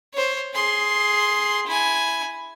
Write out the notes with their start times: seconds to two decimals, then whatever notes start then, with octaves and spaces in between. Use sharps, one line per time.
0.13 C5 C#5
0.54 G#4 C6
1.66 E4 G#5